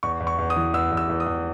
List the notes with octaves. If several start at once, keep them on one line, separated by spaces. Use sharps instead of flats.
E2 C#6
E2
C#6
E2
D#6
E3
E2 E6
E2
E6
E2
D#6
E2